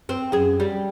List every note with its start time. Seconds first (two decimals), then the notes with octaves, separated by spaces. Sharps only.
0.09 C4
0.32 F#2 G#4
0.60 G3